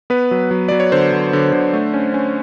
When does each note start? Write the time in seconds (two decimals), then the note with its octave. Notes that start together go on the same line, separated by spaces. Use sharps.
0.10 B3 B4
0.31 F#3
0.51 F#3
0.69 F#3 D5
0.80 C#5
0.92 D3 C5
1.12 D3
1.33 D3
1.53 D3
1.73 A3
1.94 C#4
2.14 C#4